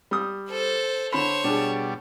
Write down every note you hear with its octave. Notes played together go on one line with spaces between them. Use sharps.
G3 D#6
A4 C5
D3 C5 C#5 B5 E7
B2 G3 D4 G#4